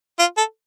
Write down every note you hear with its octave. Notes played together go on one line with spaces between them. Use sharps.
F4
A4